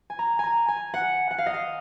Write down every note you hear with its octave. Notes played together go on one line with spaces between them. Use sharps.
G#5
A#5
G#5 A#5
G#5
F#5
F#5
F5
D#5
F5